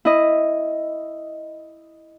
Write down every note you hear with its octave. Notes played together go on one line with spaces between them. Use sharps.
E4 D#5